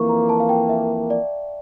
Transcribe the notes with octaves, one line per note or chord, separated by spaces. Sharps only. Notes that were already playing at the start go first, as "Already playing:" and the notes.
Already playing: F2 E3 A#3 C#6
A#5
A5
F5
G5
E5
D5